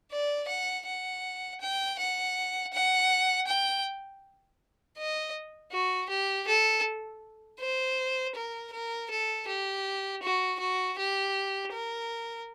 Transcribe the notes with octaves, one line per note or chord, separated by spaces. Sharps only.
D5
F#5
F#5
G5
F#5
F#5
G5
D#5
F#4
G4
A4
C5
A#4
A#4
A4
G4
F#4
F#4
G4
A#4